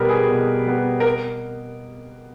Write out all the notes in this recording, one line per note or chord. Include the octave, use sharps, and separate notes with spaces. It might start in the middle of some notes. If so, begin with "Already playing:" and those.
Already playing: B2 G3 B3 A#4 B4
G#4
B2
G3 B3
A#4